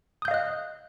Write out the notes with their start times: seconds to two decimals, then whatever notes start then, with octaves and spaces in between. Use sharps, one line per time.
0.22 D#6
0.25 G6
0.28 F5
0.31 D#5
0.34 F#6